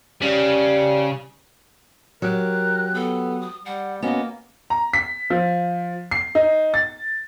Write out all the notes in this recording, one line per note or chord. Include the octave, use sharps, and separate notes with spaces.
C#3 G3
F#3 G4 A#4 F#6
B3 A4
D#6
G3 F#5
A#3 B3 C#4 F#4 D#5
A#5
B6
F3
C7
D#4
A6